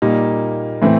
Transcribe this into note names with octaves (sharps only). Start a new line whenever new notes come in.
A#2 G3 A#3 D#4
A2 E3 A3 C4 E4